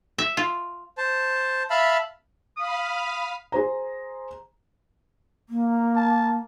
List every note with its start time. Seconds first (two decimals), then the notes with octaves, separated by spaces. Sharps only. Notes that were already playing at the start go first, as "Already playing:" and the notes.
0.18 E5
0.37 F4
0.98 C5 A5
1.70 E5 F5 A5 B5
2.57 F5 B5 D#6
3.52 G#4 C5 A#5
5.49 A#3
5.96 A5